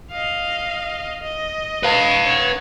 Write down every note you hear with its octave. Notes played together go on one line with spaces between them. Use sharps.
D#5 F5
D#5
B4 F5
C#5 F#5